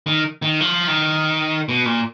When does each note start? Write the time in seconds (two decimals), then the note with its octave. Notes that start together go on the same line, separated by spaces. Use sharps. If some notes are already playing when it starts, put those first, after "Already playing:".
0.06 D#3
0.42 D#3
0.61 F3
0.88 D#3
1.69 B2
1.86 A#2